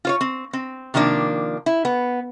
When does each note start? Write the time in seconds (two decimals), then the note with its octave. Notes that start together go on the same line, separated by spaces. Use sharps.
0.05 F4 C5 C#5
0.21 C4
0.53 C4
0.94 C3 D#3 F3 A#3 D4
1.66 E4
1.85 B3